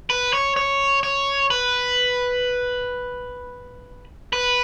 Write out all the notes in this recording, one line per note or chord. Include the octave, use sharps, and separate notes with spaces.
B4
C#5
C#5
C#5
B4
B4